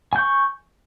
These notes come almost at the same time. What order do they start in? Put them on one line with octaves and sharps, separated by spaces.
G#5 G6 C#6